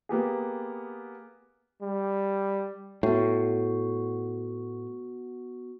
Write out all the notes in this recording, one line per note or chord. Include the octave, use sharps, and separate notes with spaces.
A#3 B3 G4 G#4
G3
A2 B3 F#4